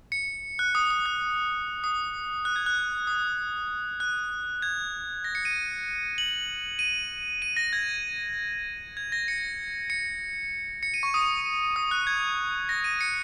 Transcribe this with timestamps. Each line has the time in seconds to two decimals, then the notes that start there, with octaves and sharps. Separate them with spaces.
0.12 C#7
0.59 F#6
0.75 D#6
0.91 D#6
1.06 F#6
1.84 D#6
2.45 F#6
2.56 G#6
2.66 F#6
3.07 D#6
4.00 F#6
4.62 G#6
5.24 A#6
5.35 C#7
5.45 D#7
6.18 F#7
6.79 D#7
7.42 D#7
7.57 A#6
7.73 G#6
8.97 G#6
9.12 A#6
9.28 C#7
9.90 C#7
10.83 C#7
10.94 D#7
11.03 C#6
11.14 D#6
11.76 D#6
11.91 F#6
12.07 G#6
12.69 A#6
12.84 D#7
13.01 C#7